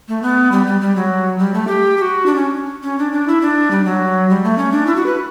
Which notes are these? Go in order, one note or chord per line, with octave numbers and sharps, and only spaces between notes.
A3
B3
G3
G3
G3
F#3
G3
A3
G4
G4
F#4
D4
C#4
C#4
D4
D4
E4
D4
G3
F#3
G3
A3
C#4
D4
E4
F#4
B4